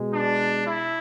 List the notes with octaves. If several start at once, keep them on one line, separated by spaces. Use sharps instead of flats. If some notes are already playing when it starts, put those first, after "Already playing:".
Already playing: B2 G#3
D4
E4